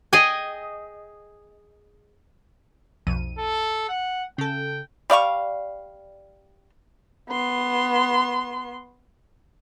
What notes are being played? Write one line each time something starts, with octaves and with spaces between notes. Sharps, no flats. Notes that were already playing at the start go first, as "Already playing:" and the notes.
G#4 D#5 G5 G#5
B1 F2 D#7
A4
F#5
C#3 A4 G5
G3 D5 F5 C#6
B3 C6